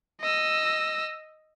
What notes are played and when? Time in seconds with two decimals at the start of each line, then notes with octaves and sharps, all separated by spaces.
0.21 D#5 E6